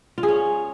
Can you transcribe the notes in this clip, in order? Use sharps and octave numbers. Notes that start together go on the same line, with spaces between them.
F4
G#4
C#4